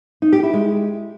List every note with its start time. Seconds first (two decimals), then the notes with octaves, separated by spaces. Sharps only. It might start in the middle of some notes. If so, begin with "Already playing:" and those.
0.22 D#4
0.33 G4
0.43 E4
0.54 G#3